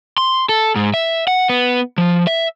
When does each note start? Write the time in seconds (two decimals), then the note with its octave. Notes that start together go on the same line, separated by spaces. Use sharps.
0.18 C6
0.49 A4
0.76 G#2
0.94 E5
1.27 F#5
1.49 B3
1.98 F3
2.27 E5